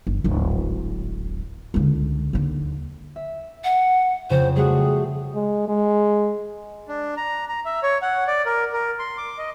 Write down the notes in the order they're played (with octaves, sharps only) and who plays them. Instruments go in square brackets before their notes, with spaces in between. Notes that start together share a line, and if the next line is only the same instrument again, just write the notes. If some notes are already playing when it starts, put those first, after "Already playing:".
[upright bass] G1
D1 G#1
C#2 D3
D#2 D3
[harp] E5
[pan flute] F#5
[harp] F2 C#3 [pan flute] C5
[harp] G3 A3 F#4 [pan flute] G#4
[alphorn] G#3
G#3
[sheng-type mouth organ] D4
A#5
A#5
E5
C#5
F#5
D5
A#4
A#4
C6
D6
D#5